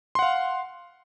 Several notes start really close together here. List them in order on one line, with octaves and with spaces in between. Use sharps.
C6 F#5 F5